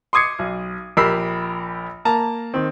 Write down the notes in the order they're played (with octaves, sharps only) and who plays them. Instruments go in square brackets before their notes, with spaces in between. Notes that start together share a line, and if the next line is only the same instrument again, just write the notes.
[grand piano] C6 D6 D#6 G#6 C7 C#7
B1
A#1 G4 A#4 B5 E6 C7
A#3 A5 A#5
D#3 C4